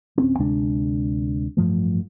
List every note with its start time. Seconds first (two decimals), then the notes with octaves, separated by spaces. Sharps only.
0.18 D1 C4 C#4
0.39 D2 C3 G#3 D4
1.57 A1 G2 F3 A3